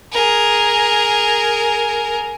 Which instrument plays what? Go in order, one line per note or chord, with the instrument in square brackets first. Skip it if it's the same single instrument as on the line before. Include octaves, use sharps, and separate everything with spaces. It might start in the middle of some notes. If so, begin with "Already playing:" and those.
[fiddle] G#4 A#4